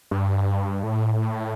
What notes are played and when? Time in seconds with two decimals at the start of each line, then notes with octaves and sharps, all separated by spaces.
0.11 G2
0.83 A2